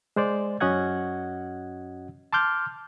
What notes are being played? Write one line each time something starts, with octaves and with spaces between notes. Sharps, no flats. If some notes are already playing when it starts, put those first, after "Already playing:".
G#3 C5 D5
F#2 C#4 F#4 D#5 F#5 G#6
A5 C6 D6 F6 G6